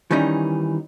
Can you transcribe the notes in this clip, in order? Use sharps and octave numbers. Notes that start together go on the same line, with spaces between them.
D#3 E3 G3 C#4 D#4